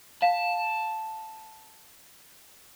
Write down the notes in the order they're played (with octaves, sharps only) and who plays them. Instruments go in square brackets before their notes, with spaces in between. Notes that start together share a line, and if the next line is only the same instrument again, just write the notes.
[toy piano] F5 [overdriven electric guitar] A5